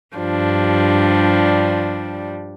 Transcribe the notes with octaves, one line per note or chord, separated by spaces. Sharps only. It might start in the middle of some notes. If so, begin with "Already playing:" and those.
G2 F3 G3 D4